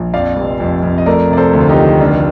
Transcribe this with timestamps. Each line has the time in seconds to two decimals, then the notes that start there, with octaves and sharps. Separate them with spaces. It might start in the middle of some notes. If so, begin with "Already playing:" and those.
Already playing: A#1
0.14 F2 D5 F5
0.36 F1
0.60 F2
0.83 F2
0.98 D#5
1.06 A3 A#4 D5
1.30 C3 D5
1.37 A4 C5
1.53 D2
1.60 F4
1.69 D#4 G4
1.77 D#3
2.00 F1 D4 F4